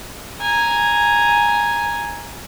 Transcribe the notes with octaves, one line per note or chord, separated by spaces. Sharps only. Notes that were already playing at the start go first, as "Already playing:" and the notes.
G#5 A#5